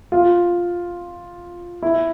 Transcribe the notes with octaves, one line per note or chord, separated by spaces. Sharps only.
F4
E4